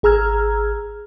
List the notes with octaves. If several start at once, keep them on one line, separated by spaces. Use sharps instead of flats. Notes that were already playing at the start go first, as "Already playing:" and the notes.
G#1 G#4 A#5 E6 F6 G#6